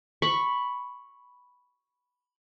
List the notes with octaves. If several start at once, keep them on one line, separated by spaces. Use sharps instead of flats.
B5 C#6